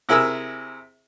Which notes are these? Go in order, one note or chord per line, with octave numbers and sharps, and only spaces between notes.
C3 E4 G#4 A#4 E6